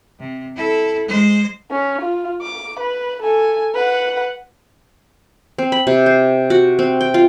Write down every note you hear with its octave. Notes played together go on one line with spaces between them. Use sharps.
C3
E4 A4
G#3 C5
C#4
F4
D6
B4
A4 G#5
B4 F#5
C4
B5
C3
C5
F#4
C4
G5
F4